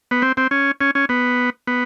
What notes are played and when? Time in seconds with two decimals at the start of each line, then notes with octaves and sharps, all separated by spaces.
0.11 B3
0.22 C4
0.37 C4
0.51 C#4
0.81 C#4
0.95 C#4
1.09 B3
1.67 B3